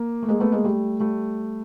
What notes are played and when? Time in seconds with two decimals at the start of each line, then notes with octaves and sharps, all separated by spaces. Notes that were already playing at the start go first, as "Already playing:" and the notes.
Already playing: A#3
0.22 A3
0.28 G#3 A#3
0.40 A3 B3
0.52 G#3 A#3
0.64 G3 A3
1.00 G3 A3